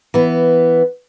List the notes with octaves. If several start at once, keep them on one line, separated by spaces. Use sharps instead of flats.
E3 B3